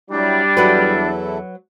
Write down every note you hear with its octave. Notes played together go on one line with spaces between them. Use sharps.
F#3 G3 D4 E4 G4
E2 F#3 E4 A4 B4